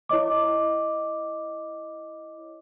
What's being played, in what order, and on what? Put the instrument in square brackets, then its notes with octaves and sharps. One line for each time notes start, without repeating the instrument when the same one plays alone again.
[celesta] E4 C#5 D#5 D6